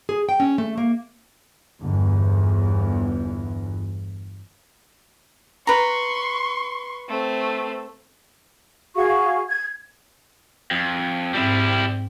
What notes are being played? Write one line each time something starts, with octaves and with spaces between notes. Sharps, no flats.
G#4
G5
C#4
A3
A#3
G1 E2
B4 A#5 C6 C#6
A3 C4
F#4 G#4 F5 C#6
G#6
F2
G#2 G3 C4 E4